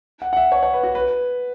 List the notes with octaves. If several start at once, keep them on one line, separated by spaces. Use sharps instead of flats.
F#5
F#5
E5
C#5
C#5
B4
F#4
B4